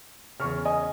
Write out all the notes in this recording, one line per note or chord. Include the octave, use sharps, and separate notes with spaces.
E2 C#3 C#6 F6
D#5 G#5